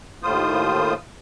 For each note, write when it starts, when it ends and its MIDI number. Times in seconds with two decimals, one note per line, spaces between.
0.23 0.94 39
0.23 0.94 45
0.23 0.94 65
0.23 0.94 72
0.23 0.94 87